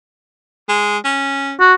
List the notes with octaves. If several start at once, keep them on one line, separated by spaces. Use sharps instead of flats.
G#3
C#4
F#4